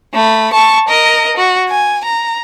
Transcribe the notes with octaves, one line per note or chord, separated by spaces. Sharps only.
A3 B5
A5 C#6
A#4 D#5
F#4
G#5
A#5